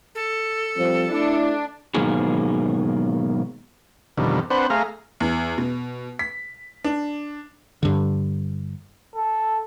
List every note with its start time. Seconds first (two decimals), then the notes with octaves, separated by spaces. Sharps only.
0.15 A4
0.77 F3 G3 C4
1.11 A3 D4 E4
1.94 G#2 B2 D#3 F#3 A#3 G#4
4.17 F2 B2 D3 D#3 G3
4.50 C4 D4 B4 C5 F#5
4.70 A3 G#4 F5 A#5
5.20 E2
5.58 B2
6.19 B6
6.84 D4
7.83 G2 D3
9.15 A4